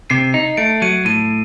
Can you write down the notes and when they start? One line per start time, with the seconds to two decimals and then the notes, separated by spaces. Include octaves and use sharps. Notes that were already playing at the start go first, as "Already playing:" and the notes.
0.10 C3 C7
0.34 D#4
0.57 A3 D7
0.82 F#3 D#7
1.05 A2 D#7